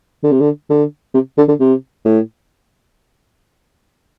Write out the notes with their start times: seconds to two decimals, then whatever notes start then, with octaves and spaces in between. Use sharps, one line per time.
0.23 D3
0.32 C3
0.40 D3
0.70 D3
1.14 C3
1.38 D3
1.48 D3
1.60 C3
2.05 A2